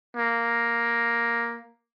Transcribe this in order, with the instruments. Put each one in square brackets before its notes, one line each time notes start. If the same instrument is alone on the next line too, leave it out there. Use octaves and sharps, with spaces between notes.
[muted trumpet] A#3